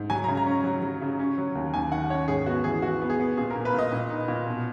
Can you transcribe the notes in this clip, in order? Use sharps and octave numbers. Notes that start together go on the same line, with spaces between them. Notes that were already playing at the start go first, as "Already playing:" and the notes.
Already playing: G#2
F#3 G#5
A#5
C#3
A#5
C#4
F#3
F#3
C#3
C#4
F#3
D#2
D#2 G#5
D#3 F#5
C#4 C#5
G#2 G#4
B3 F#4
E3 G#4
E3 F#4
B3
G#4
B3
A#2 G#4
A#4
A#2
B4
A#2
D#5
A#2
D#4
A#2
B2